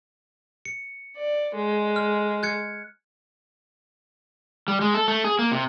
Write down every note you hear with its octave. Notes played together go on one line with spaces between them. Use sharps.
C#7
D5
G#3
F6
F#6 G#6 C#7
G3
G#3
A4
A3
G#4
A#3
C3